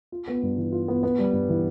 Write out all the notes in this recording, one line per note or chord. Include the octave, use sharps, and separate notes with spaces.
F4
B3
G2
E3
F4
B3
B3
G3
G2
E3